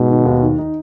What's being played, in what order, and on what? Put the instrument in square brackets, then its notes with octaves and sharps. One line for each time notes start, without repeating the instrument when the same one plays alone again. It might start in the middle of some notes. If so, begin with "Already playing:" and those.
Already playing: [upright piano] G#2 [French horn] B2
[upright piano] D#3
D#2
D#3
D#4